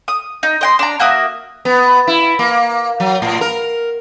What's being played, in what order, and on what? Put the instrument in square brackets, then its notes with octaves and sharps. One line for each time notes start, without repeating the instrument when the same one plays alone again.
[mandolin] D#6
D#4
D#5 G5 C6
D4 A#5
A#3 F#4 E5 D#6
[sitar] B3
E4
A#3
F#3
A2
A#4